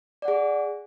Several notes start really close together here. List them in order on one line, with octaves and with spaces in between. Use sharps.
D5 F#5 G#4